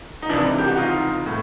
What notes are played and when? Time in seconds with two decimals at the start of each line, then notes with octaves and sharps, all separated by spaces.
0.22 D#4
0.29 C#2 C3 E3 D4 E4
0.58 G4
0.68 F#4
0.77 D#4 F4
1.26 A2